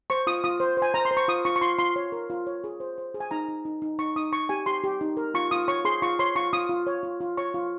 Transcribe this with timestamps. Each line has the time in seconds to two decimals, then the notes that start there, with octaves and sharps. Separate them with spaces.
0.10 C5 C#6
0.27 F4 D#6
0.44 F4 D#6
0.60 C5
0.77 C5
0.82 G#5
0.94 C5 A#5
1.05 C6
1.11 C5
1.17 C#6
1.28 F4 D#6
1.45 F4 C#6
1.56 C#6
1.61 F4 C6
1.79 F4 C6
1.96 C#5
2.12 A#4
2.30 F4
2.47 C#5
2.64 G#4
2.80 C5
2.98 C5
3.14 G#4
3.20 G#5
3.31 D#4 A#5
3.49 D#4
3.65 D#4
3.82 D#4
3.99 D#4 C#6
4.16 D#4 D#6
4.33 D#4 C#6
4.49 G4 G#5
4.66 G4 C6
4.84 G4
5.01 D#4
5.17 A#4
5.34 F4 C#6
5.51 F4 D#6
5.68 C#5 C#6
5.85 G#4 C6
6.02 F4 C#6
6.19 C#5 C6
6.36 F4 C#6
6.53 F4 D#6
6.69 F4
6.87 C#5
7.03 F4
7.21 F4
7.37 C#5 C#6
7.54 F4